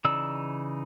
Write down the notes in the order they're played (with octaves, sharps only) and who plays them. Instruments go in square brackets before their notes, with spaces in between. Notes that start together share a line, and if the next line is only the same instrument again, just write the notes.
[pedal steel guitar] C#3 E3 D#4 D5 E6